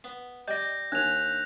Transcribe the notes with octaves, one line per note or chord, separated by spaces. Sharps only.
B3
G3 D#5 G5 G6 A#6
D#2 D4 F#6 F7